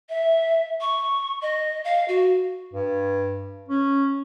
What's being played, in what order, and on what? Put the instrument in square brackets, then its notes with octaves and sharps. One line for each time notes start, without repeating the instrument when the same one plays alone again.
[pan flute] E5
C#6
D#5
F5
F#4
[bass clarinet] G2
C#4